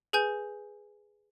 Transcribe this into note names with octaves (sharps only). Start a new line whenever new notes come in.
G#4 B4 G#5 G6